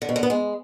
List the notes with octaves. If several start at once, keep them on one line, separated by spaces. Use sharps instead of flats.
D3
B2
D3
B3
G#3